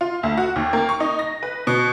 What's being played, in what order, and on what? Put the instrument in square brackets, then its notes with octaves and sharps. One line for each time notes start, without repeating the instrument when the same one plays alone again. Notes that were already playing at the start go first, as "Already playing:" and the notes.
[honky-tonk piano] F4
D2
F#4
D#2
A#3
C#6
D#4
A#6
B4
B2